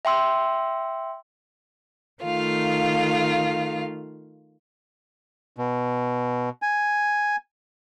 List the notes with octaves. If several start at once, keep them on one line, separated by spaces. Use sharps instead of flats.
E5 G5 C6 E6
D#3 A3 F4 F5
B2
G#5